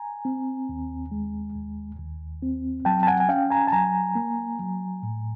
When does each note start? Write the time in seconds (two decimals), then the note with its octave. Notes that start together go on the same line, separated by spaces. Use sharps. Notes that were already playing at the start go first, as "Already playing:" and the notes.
Already playing: G#5 A#5
0.25 C4
0.69 D#2
1.11 G#3
1.55 D#2
1.99 D#2
2.42 C4
2.85 F#3 G5 A5
3.03 A5
3.07 F#5 G#5
3.20 G#5
3.29 C#4 F5 G5
3.50 G#5 A#5
3.67 A5
3.72 F#3 G#5 A#5
4.15 A#3
4.59 F#3
5.03 A2